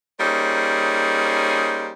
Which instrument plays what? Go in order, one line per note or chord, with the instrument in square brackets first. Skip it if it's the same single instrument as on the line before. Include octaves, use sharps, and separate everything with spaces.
[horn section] G3 A#3 C#4 D#4 G#4 C5